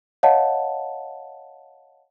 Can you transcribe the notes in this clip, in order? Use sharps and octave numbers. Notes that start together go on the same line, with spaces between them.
C#5 D#5 F5 F#5 A5